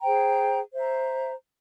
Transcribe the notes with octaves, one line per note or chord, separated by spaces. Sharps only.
G#4 C5 G5 A#5
C5 E5 A#5